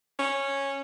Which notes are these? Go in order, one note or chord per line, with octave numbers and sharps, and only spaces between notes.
C#4